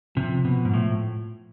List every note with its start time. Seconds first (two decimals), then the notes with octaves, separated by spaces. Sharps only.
0.16 C3 F3
0.45 B2
0.65 G#2
0.73 A2